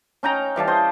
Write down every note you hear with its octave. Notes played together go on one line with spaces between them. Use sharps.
C#4 D#4 G5 A#5
E3 G3 F5 A5
C5 D#5